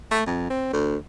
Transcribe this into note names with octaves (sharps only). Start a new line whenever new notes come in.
A3
F2
C4
D2